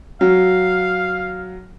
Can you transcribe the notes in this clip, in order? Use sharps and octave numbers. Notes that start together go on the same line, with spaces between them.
F#3 F5